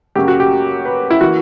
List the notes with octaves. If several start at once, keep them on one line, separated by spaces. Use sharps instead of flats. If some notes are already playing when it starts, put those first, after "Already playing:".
F#2 C#3 F#3 A#3 G4
F#4
G4
B4
E4
E3 A#3 F#4